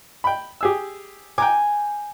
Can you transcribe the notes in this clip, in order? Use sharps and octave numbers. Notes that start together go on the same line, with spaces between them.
G5 B5
G4 G#4 E6
G5 G#5 A#5 D6